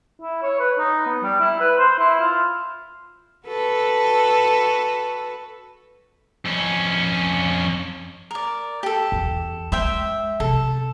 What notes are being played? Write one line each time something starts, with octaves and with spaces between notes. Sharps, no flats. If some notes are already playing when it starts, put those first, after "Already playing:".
E4
C#5
B4
D#4
B3
G3
E4
B4
C5
E4
F4
F#4 A4 B4
F2 C#4
A#4 D5
G4 A4
E2
G#3 C5 E5 G5
C3 A4